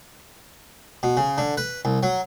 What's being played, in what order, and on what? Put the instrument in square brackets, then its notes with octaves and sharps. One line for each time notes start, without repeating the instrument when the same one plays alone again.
[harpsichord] B2
C#3
D3
B4
C2
F#3